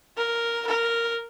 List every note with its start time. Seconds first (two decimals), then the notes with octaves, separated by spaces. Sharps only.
0.17 A#4
0.67 A#4